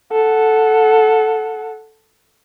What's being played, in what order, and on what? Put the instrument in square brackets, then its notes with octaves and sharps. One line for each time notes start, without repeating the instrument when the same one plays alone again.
[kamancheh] A4 F#5